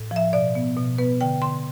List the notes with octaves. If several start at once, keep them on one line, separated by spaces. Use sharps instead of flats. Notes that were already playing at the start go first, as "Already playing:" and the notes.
Already playing: A2
F3
E5
B2 D5
B3
B2
B3 B4
D3 G5
D3 C6